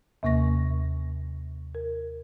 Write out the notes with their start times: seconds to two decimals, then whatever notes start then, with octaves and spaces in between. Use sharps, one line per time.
0.23 D#2 C3 A#3 C#6 A#6
1.75 A#4